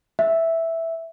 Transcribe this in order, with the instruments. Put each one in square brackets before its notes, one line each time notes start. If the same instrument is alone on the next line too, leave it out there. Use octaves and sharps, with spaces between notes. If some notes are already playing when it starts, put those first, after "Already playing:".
[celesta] E5